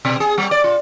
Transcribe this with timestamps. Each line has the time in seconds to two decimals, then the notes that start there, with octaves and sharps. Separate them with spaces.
0.05 B2
0.20 G#4
0.38 G3
0.51 D5
0.64 F4